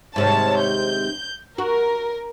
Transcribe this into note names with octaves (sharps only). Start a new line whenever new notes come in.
G#2 C3 D#3 C#5 A5
G6
F#4 A#4